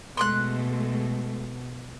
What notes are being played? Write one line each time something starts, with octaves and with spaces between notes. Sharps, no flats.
B2 G#3 A3 A4 C6 D6 F#6